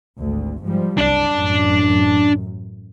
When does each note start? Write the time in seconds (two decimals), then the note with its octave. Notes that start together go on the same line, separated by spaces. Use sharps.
0.20 G#1 D2
0.64 G#2 F3 G3
0.98 F#1 C2 D4 D5
1.32 A1 F#2